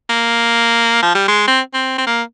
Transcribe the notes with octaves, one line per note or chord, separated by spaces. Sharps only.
A#3
F3
G3
G#3
C4
C4
C4
A#3